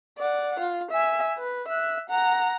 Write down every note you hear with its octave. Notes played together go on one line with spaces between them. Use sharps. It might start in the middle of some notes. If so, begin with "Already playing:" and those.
D5 F#5
F4
E5 G#5
B4
E5 F#6
F#5 A#5